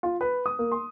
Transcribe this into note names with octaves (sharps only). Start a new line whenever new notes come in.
F4
B4
D#6
A#3
C6